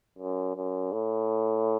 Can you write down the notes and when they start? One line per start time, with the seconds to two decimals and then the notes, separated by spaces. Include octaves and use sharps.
0.18 F#2
0.56 F#2
0.92 A2